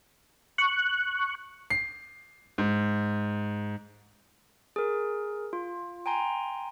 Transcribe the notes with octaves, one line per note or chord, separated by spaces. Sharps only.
C#6 F#6
C7
G#2
G#4 A#4
F4
G5 G#5 A#5 C6